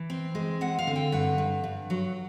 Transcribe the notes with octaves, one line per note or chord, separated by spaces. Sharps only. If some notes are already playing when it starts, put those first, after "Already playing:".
Already playing: E3
C4
G#3
C4 F#5
F5
D3
G5
G2 F#5
G2
G2
F#3